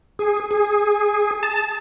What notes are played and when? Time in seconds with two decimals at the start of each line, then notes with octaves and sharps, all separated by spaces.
0.19 G#4
0.51 G#4
1.43 A5